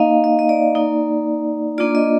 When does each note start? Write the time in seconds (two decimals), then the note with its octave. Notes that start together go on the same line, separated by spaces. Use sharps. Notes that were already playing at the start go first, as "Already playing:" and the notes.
Already playing: A#3 D#4 D#5 F5
0.24 D#5
0.39 D#5
0.49 D5
0.75 A#3 D#4
1.78 A#3 D4 F4 D5
1.95 D#5